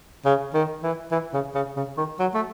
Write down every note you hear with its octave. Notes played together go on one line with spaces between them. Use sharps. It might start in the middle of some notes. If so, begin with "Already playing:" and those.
C#3
D#3
E3
E3
C#3
C#3
C#3
D#3
F#3
A3